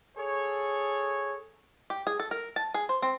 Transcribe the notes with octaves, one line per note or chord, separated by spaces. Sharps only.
G#4 A4 C#5
G4
G#4
A4
A#4
A5
G#4
C5
C4